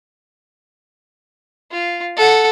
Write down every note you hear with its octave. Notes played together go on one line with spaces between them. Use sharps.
F4
A4 F#5